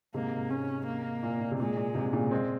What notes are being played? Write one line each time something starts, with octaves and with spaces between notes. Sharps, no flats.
G#2 C3 A#3
G#2 C3
C#4
A#3
A#2
A#2
C3
A#2 G#3
A#2
G#2 C3
A#2 C#3
G#3 C4